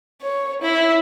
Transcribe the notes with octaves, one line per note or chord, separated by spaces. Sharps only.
C#5
E4